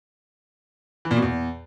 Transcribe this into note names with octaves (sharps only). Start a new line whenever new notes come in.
E3
A#2
B2
E2